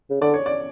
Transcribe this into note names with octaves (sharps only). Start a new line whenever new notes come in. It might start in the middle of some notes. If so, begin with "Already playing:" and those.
C#3
D3 D5
C#5
D5